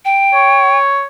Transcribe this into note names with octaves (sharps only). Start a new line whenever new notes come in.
G5
C#5